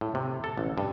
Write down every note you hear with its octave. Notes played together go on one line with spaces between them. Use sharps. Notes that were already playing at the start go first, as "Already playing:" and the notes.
A2
C3
A4
A1
G2